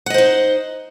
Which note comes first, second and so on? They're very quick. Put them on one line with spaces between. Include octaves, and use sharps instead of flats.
F#5 D#5 C5 D#4